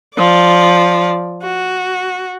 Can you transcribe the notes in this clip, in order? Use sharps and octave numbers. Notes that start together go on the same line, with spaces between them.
F3 D5
F#4